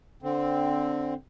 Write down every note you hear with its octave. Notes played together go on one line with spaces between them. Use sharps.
D3 C4